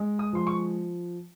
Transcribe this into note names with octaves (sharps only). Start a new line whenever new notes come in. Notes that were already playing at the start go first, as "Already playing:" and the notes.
Already playing: G#3
D#6
F3 C6
C#6